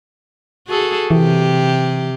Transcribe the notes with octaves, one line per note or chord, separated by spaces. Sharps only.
F#4 G#4 A4
C3 E3 G4